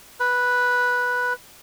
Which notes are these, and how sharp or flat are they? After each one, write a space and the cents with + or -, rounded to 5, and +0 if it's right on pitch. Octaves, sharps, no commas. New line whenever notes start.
B4 -5